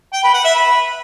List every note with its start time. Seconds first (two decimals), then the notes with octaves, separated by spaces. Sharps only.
0.13 G5
0.24 B4
0.34 F#5
0.44 E5
0.55 B4